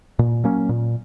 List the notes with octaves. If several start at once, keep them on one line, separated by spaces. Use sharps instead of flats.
A#2
F#3 A#3 C#4
A#2